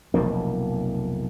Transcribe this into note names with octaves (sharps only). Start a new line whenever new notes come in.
F1 B1 F3 A#3